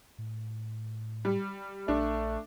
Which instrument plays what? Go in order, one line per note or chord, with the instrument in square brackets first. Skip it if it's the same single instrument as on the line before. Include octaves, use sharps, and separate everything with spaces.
[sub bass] A2
[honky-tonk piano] G3
[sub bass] A#1 [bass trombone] A3 [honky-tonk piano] D4